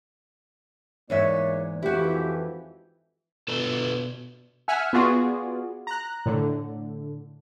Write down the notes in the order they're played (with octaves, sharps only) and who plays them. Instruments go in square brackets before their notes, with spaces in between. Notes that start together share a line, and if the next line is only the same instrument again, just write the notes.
[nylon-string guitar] E2 G#2 E5 [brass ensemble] A#3 E4 D5 [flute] C#5
[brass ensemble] F2 G#2 E3 [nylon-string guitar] E4 F#4 [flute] G4
[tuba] B2 [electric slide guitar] D4 A4 B4
[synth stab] E5 F#5 G#5 F6
B3 F4 F#4 G#4 D5
A#5 F#6
A2 D3